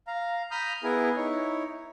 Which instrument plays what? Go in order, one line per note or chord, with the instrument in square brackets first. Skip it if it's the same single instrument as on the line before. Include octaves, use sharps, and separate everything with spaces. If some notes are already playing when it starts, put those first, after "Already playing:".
[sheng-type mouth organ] F5 A#5
A#5 B5 D#6 F6 G6
B3 E4 G#4 A#4
D#4 E4 C#5